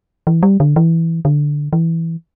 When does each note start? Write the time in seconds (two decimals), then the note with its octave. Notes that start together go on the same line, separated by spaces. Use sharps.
0.27 E3
0.43 G3
0.60 D3
0.76 E3
1.25 D3
1.73 E3